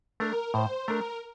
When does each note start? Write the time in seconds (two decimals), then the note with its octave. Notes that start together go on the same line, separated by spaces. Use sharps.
0.20 A3 D4 A#4
0.54 A2 C5
0.88 A3 D4 A#4